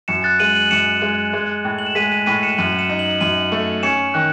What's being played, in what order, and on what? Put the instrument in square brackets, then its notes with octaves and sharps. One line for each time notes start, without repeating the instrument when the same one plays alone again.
[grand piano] F#2 [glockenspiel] C#7 E7
[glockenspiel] F#6 A6
[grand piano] G#3 [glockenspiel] D#7 F#7
[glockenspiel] D#7 F#7
[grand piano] F#2 [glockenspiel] C#7 E7
[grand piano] G#3
G#3
A2
[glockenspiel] F#7
E7
[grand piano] G#3 [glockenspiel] B6 D#7
[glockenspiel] B6 D#7
[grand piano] A2 [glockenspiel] B6 D#7
[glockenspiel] C#7 E7
[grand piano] F#2 [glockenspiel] D#7 F#7
[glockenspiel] C#7 E7
[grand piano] D#4
[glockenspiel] F#7
[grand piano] F#2 [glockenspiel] D#7 F#7
[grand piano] A3
[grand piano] C#4 [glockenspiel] C#7 E7
[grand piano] D#3 [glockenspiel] F#6